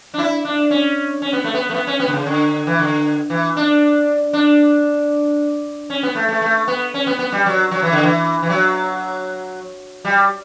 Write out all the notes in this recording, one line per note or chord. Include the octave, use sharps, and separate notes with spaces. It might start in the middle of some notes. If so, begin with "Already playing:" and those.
D4
E4
D4
C#4
C#4
B3
A3
B3
A3
B3
C#4
B3
D3
C#3
D3
E3
D3
E3
D4
D4
C#4
B3
A3
A3
A3
B3
C#4
B3
B3
G3
F#3
F#3
E3
D3
E3
E3
F#3
G3